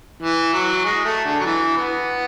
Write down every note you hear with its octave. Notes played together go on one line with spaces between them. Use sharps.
E3
F#3
G#3
A3
D3
F#3
E3
B3